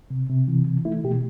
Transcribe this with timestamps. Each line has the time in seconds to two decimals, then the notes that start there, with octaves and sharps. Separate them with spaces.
0.10 C3
0.29 C3
0.48 E3
0.67 E3
0.85 A3 E4
1.04 B2 G4